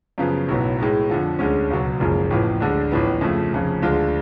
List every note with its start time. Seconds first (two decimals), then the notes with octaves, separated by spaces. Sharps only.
0.18 F#2 C#3 F3 B3
0.49 B1 A2 F#3 B3
0.78 A2 G#3 B3
1.09 F2 D3 F3
1.39 D2 D3 G#3 C#4
1.70 C#2 B2 F#3
2.00 F#1 F#2 F3 G#3
2.30 A1 A2 F3 B3
2.60 D2 D3 G#3 D4
2.91 A1 A2 F3 B3
3.21 F2 C#3 F3 A3
3.52 F1 F2 C#3
3.82 D2 D3 G#3 D4 F4